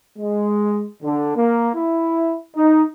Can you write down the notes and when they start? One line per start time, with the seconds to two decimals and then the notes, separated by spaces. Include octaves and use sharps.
0.18 G#3
1.03 D3
1.35 A#3
1.74 E4
2.55 D#4